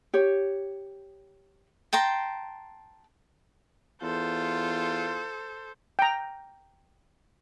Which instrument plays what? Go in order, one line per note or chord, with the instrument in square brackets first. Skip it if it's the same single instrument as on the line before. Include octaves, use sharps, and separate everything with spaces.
[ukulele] G4 C#5
[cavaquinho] G5 A5 A#5 C6
[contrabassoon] E2 [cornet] F4 [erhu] A4 [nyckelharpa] C5
[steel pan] G5 A#5